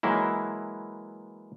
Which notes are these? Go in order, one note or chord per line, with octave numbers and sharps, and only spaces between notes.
E3 F#3 G#3 A#3 E4